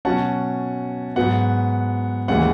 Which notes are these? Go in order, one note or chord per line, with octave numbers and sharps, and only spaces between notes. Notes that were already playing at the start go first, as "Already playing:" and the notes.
B2 F#3 C#4 F#5 A5
G#2 F#3 B3 F#5
D#2 C#3 E3 G#3 F#5